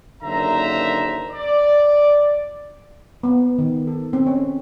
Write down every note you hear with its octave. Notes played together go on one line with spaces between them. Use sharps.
F#1 D3 D#3 C5 E5 A#5
D5
B3
D#3
A4
C4
C#4